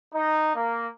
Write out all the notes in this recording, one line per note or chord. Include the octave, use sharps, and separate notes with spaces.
D#4
A#3